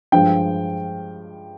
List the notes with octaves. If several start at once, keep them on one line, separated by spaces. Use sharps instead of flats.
G2 F3 G#3 G5